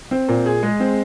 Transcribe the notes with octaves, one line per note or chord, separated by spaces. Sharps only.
C4
A#2
G#4
G#3
C4